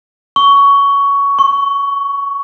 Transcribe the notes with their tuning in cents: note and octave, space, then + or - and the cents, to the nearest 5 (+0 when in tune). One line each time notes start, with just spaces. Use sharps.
C#6 +15
C#6 -20